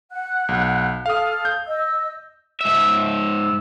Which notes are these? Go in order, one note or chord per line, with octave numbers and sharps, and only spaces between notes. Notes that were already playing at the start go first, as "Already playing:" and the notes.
F#5 F#6
B1
A4 F5 D#6 F6
G6
D#5 E6
G#2 E5